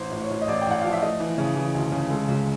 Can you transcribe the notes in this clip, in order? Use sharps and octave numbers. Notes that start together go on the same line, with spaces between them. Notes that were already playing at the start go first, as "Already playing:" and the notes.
Already playing: A1 C5
A2
C#5
A2
D#5
A1 D5
G5
A1 F#5
F3 F5
E5
A3 D#5
E3
C#3
E3
D2
C#3
G#3 A4
C#2